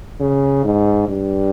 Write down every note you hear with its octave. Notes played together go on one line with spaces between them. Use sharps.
C#3
G#2
G2